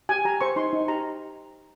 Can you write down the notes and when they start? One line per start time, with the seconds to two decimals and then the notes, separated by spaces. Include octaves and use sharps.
0.09 G4 G#5
0.25 G4 A#5
0.41 C5 C#6
0.56 D#4 C6
0.73 D#4
0.88 G4 A#5